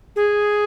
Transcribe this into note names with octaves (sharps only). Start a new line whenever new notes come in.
G#4